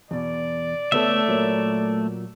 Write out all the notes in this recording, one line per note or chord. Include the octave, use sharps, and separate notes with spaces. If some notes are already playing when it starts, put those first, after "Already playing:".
E2 B2 D5
C#2 A3 B3 A4 E5
A#2 F#3 A#3